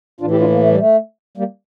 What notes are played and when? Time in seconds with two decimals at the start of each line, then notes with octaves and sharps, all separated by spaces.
0.21 A2 E3 D4 F4
0.31 E4 G4
0.40 D4 F4
0.50 A#3
0.59 A3
0.69 G3
0.79 A3
1.37 G3 A#3